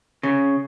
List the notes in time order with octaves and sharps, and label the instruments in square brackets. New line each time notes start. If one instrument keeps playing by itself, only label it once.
[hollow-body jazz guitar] C#3